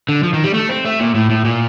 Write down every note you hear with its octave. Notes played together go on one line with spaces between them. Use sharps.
D3
F3
D#3
G3
A3
C4
A3
A#2
A2
A2
A#2